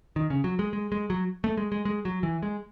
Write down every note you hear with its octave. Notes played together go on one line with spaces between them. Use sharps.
D#3
C#3
F#3
G#3
G#3
G#3
F#3
A3
G#3
G#3
G#3
F#3
E3
G#3